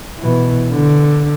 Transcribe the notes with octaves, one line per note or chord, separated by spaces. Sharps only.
B2 E3
D3